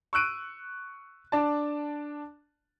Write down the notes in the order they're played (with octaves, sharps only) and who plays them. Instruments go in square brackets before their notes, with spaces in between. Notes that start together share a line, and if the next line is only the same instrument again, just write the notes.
[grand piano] C#6 E6 F#6 D7 D#7
D4 D5 A5